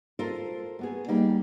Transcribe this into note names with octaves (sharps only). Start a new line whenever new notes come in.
F4 A4 A#4 C5
A3 B3 G#4
G3 A#3 D#4